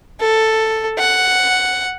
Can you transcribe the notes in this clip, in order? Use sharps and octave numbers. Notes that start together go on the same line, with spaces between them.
A4
F#5